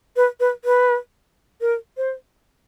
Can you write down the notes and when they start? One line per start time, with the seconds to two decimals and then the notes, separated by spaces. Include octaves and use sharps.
0.16 B4
0.40 B4
0.65 B4
1.61 A#4
1.97 C5